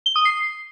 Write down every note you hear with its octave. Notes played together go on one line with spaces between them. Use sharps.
G7
D#6
C7